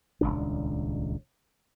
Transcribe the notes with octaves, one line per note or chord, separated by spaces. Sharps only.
D#1 G#1 C#2 D4